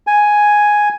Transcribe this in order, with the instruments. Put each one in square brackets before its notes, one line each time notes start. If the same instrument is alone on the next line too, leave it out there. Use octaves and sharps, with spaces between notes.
[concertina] G#5